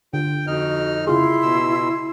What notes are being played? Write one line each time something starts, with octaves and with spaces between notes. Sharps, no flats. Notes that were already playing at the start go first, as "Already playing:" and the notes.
D3 F4 G5
F2 D#4 F#4 F6
C#3 E4 F4 G#4 C6
B2 E6